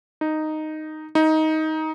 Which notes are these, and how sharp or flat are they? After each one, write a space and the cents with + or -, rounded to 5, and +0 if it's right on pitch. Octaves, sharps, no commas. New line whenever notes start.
D#4 -5
D#4 +15